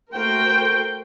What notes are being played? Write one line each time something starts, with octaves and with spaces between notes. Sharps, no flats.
A3 F#4 A#4 C5 G5